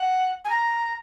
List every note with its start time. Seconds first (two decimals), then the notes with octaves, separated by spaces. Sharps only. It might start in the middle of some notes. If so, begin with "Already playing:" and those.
Already playing: F#5
0.44 G#5
0.49 A#5